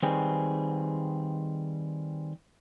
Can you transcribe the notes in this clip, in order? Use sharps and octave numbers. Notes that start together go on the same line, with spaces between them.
D#3 G3 C4 G#4 B4